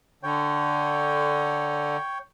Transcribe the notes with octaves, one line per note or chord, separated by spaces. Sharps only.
D3 C#5 G5